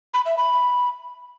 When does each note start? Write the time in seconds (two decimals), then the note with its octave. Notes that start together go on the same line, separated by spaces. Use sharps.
0.14 B5
0.26 E5
0.38 B5